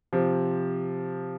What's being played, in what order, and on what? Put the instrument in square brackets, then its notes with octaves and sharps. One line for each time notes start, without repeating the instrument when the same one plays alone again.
[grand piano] C3 F3